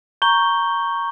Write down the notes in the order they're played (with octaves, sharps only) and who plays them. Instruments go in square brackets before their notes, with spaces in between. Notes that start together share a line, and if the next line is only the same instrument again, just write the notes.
[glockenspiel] A#5 C#6 G6 G7